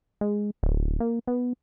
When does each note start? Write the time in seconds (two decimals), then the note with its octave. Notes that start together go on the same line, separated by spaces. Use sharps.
0.21 G#3
0.63 D1
1.00 A#3
1.27 B3